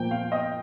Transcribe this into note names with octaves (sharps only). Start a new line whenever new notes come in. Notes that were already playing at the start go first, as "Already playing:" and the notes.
Already playing: A#2 F3 A#3 G5
F5
D#5